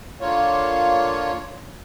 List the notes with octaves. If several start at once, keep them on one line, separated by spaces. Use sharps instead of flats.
D3 A#3 F4 C#5